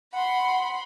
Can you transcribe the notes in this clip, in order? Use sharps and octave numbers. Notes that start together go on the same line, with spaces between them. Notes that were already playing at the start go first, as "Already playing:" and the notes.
F#5 B5 C6